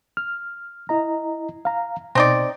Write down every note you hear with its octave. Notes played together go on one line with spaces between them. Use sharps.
F6
E4 D#5 A#5
F5 A#5
B2 C4 D#4 D5